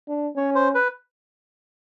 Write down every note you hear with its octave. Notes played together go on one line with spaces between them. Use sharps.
D4
C#4 C#5
C5
B4